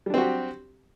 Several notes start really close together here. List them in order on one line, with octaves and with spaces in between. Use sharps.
G3 D4 C4 F#4 G4